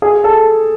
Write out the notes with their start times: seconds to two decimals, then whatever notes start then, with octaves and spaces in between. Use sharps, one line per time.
0.02 G#4
0.24 A4